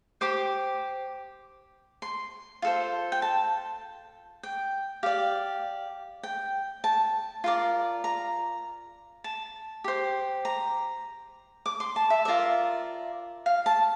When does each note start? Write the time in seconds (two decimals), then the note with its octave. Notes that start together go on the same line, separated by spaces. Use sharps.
0.21 G4 C5 D6
2.02 C6
2.62 F4 A4 C5
3.12 G5
3.22 A5
4.43 G5
5.03 G4 D5 F5
6.23 G5
6.84 A5
7.44 F4 A#4 D5
8.04 A#5
9.24 A5
9.84 G4 C5
10.45 A#5
11.66 D6
11.80 C6
11.96 A5
12.10 E5
12.25 F4 A#4 D5 E5
13.46 F5
13.66 A5